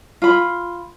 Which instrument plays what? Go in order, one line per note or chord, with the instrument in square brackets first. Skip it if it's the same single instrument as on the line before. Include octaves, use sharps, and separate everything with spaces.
[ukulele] F4 B5